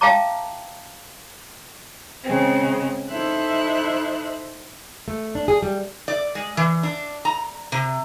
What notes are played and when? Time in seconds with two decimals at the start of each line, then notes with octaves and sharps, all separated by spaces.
0.01 E5 F5 G5 A5 A#5 D6
2.23 C#3 G#3 C4
3.09 D#4 E4 A4 C5 E5 F#6
5.08 A3
5.35 D4
5.48 G#4
5.62 G3
6.08 D5
6.35 G#3
6.57 E3
6.83 D4
7.25 A#5
7.72 C3